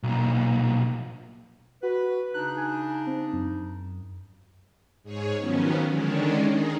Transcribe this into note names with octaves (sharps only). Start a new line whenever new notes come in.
B1 A#2
F#4 B4
C#3 D4 D#4 F#6
G#5
C4
F#2
G#2 G#4 C#5
D#3 F3 F#3 B3 C#4
D3 D#3 G#3 C#4 D4
D#3 D#4 G#4